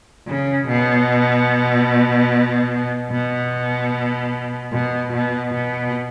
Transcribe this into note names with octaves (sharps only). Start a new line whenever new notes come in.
C#3
B2
B2
B2
B2
B2